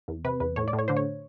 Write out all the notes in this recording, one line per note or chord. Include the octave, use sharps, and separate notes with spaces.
E2
C3 B4
E2 B4
A2 C#5
D5
A2
C#5
D3 C5
C#5